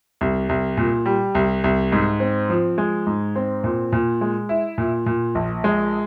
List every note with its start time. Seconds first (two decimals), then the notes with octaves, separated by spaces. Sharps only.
0.21 C2
0.49 C2
0.77 A#2
1.06 G3
1.35 C2
1.64 C2
1.92 G#2
2.20 C4
2.49 F3
2.78 G#3
3.07 G#2
3.36 C4
3.64 A#2
3.93 A#2
4.21 G#3
4.49 E4
4.78 A#2
5.06 A#2
5.35 A#1
5.64 G#3